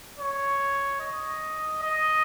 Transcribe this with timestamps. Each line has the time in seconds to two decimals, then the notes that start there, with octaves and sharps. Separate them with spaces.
0.19 C#5
1.01 D#5
1.83 D#5